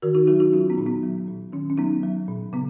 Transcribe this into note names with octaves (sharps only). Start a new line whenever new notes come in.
D#3 F#4 A#4
D#4 F#4
F#3 D#4 F#4
D#4 F#4
F#3 C#4 F4
B3 D#4
A#2
B3 D#4
F#3
A#2
D#3 C#4
C#4
F#3 B3 D#4
F#3
A#2
C#3 B3